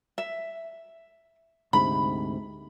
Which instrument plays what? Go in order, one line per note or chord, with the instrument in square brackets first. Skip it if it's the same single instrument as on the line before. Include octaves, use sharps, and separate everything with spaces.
[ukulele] E5
[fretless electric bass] D2 G#2 C3 [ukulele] B5